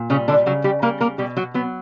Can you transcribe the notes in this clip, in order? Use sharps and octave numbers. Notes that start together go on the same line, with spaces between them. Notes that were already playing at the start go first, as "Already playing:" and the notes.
Already playing: A#2
C#3 G3 C#4
D3 D4
C#3 F#3 F#4
G3 G4
G3 A#3 A#4
A#3 A#4
B2 G3 G4
F#3 F#4
F#3 B3